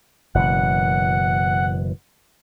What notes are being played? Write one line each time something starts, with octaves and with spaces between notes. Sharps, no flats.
F#1 B2 E3 F#5